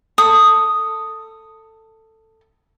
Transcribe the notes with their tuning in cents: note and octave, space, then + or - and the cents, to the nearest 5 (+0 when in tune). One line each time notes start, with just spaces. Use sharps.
A4 +15 D#6 +0